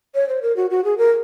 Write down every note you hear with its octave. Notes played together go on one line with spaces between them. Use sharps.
C#5
C5
A#4
F#4
F#4
G#4
A#4